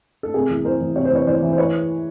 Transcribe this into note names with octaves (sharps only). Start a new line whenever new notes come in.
A4
C3 G#4 A#4
E2
E2 A#4 C5
E2
C3 C#5
C5
E2 B4 C#5
E2 C5 D5
E3
C5
B4 C#5